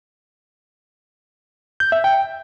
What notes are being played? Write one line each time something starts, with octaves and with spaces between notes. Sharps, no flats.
G6
E5
G5